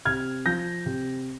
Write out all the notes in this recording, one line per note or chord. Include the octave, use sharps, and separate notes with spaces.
C3 F6 G#6
F3 G6 A#6
C3